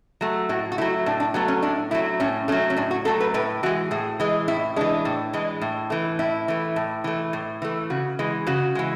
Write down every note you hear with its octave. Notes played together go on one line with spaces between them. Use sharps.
F#3 A3
A2 F#4
F#4
F#3 A3 E4
A2 D4
D4
F#3 A3 B3
C#4
A2 D4
F#3 A3 E4
A2 C#4
F#3 A3 C#4
C#4
A2 D4
F#4
F#3 A3 A4
B4
A2 B4
E3 G#3 F#4
A2 G#4
E3 G#3
A2 E4
E3 G#3 D4
A2
E3 G#3
A2
E3 A3
A2 E4
E3 A3
A2
E3 A3
A2
E3 A3
C#3 F#4
E3 G#3
C#3 F#4
E3 G#3